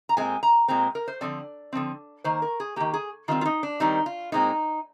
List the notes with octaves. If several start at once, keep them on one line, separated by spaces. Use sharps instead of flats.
A#5
A#2 G#3 C4 G#5
A#5
A#2 G#3 C4 A#5
A#4
C5
D3 F3 C4 D5
D3 F3 C4
D#3 A#3 C5
A#4
G#4
D#3 A#3 G4
G#4
D#3 G3 C4 F4
F4
D#4
D4
D#3 G3 C4 D#4
F4
A#2 G#3 C4 D#4